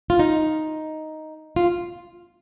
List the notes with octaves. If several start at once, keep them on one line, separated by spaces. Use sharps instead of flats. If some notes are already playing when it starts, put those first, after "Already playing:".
F4
D#4
F4